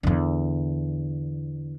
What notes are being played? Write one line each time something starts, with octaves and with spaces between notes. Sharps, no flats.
E2 D3